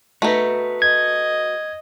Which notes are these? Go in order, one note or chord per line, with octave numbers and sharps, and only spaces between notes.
A3 D#4 F#4 B4
D#5 G#6